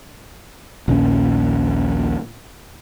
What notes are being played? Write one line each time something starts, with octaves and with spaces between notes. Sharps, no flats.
A#1 D#2 A#2 C#4